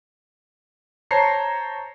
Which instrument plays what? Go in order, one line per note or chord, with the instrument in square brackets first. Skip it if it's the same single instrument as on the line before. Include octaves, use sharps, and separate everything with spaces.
[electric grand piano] C5 C#5 A5 A#5 C7 C#7